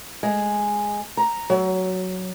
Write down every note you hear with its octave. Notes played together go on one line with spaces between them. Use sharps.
G#3
A#5
F#3